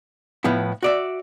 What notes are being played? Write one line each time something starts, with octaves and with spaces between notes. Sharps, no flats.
A2 F3 B3 E4
F#4 D5 E5